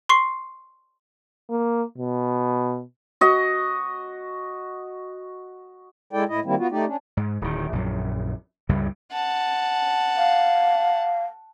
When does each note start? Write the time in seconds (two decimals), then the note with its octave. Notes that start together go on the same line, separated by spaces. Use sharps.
0.09 C6 C#6 C7
1.50 A#3
1.98 B2
3.21 F#4 D#5
6.13 G#3 E4 A4 D5 G5
6.29 A2 E4 D#5
6.45 D#3 G3 A#3 C4 E4
6.58 B3 F4 F#4
6.71 A3 D#4 G4 D5
6.87 C#4 D4
7.17 G#2
7.41 D1 D#3
7.73 A#1 F#2
8.69 C#2 G2 C#3 G3
9.12 F#5 A5
10.17 F5